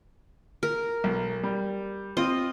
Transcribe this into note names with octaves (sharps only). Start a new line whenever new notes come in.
A#4
B1
G3
C4 F4 D#5